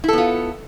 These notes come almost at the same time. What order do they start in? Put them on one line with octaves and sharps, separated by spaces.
E4 A4 B3 F4